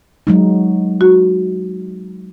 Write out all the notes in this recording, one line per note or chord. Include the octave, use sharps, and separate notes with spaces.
F#3 G#3 D#4
F#4